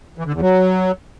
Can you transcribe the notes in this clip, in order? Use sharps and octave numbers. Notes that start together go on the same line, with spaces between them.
E3
D3
E2
F#3